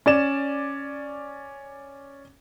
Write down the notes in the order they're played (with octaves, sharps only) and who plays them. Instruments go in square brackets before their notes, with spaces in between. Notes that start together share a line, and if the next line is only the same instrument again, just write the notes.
[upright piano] C#4 D5 E7